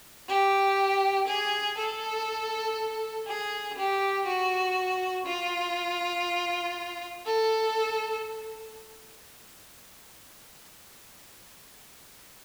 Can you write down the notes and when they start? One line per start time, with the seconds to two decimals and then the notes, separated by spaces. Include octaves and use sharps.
0.29 G4
1.28 G#4
1.78 A4
3.27 G#4
3.78 G4
4.27 F#4
5.26 F4
7.26 A4